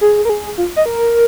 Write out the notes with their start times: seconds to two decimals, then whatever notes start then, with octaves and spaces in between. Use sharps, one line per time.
0.01 G#4
0.25 A#4
0.30 G#4
0.58 F4
0.76 D#5
0.86 A#4